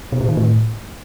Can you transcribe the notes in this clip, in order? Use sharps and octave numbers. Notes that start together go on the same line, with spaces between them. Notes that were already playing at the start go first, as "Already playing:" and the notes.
B2
A#2
D#3
A2